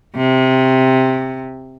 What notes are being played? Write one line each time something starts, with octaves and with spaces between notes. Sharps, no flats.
C3